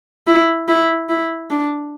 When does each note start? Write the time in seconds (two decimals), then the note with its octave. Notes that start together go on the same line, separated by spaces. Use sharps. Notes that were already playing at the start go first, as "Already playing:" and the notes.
0.27 E4
0.68 E4
1.09 E4
1.51 D4